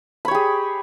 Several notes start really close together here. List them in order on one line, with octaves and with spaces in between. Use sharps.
B5 C#5 G4 G#4